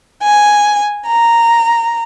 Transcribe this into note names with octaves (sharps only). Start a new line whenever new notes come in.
G#5
A#5